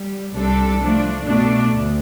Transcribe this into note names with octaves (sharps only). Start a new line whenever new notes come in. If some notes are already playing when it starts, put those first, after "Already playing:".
Already playing: G3
C2 C3 G3 D4 A4
F3 A3 D4
B2 A3 D4
D2